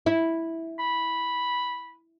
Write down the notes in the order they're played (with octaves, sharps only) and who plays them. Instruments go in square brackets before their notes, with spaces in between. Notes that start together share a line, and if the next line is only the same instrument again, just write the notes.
[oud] E4
[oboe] B5